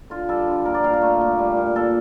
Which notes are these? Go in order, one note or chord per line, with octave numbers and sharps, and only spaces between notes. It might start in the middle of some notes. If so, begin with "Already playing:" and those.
D3 F4
G3 A4
D3
A#2 A#4
D5
A#2 F5
A#4
A3
A#2
G3
A#2
A#2 A4